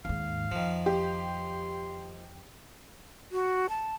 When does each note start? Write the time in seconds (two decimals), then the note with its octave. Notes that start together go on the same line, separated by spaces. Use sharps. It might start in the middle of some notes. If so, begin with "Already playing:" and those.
0.05 D#2 G#2 F5
0.52 F2 D#3 F3
0.86 G4 C6
3.32 F#4
3.69 A5